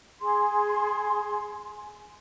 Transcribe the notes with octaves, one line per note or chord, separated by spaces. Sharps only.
G#4 C6